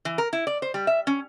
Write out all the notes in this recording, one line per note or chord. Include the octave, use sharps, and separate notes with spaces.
E3
A#4
E4
D5
C5
G3
E5
C#4